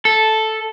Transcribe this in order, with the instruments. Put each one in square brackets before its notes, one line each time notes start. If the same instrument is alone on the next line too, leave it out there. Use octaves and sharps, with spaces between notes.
[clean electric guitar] A4